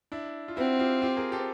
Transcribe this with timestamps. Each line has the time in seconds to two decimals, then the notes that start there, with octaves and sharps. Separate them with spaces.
0.12 D4 E4
0.48 F4
0.57 C4 E4 F#4
0.80 F4 G4
1.02 F4 G4
1.17 G#4 A#4
1.32 G4 A4